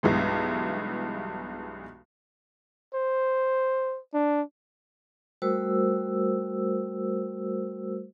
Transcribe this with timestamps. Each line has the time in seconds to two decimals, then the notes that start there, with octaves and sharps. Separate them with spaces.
0.03 B1 G2 E3 G#3
2.94 C5
4.14 D4
5.42 G3 A3 F#4 A#4 C5 E6